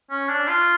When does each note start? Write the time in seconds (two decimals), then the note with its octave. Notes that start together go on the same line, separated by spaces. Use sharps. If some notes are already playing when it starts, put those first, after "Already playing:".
0.11 C#4
0.29 D4
0.48 F4